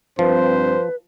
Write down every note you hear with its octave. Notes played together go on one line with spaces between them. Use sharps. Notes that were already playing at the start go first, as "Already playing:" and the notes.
G2 F3 C4 B4 C5